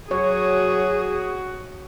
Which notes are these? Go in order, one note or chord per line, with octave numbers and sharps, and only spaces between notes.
F#3 F#4 G#4 C#5